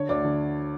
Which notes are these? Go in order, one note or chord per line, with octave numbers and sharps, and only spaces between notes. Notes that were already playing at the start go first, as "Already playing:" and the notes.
Already playing: D3 C#5
D2 D5
D3